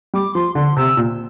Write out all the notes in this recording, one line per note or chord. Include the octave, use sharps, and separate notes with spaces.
G3 D6
F3 C6
D3 C6
C3 E6
A#2